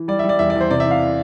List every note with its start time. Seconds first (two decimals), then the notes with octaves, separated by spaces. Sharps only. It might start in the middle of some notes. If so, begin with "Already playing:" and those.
Already playing: E3
0.08 G3 D5
0.19 G3 E5
0.29 D5
0.39 E2 E5
0.50 D5
0.55 E2
0.61 C5
0.70 C3 D5
0.80 E5
0.86 E3
0.91 F5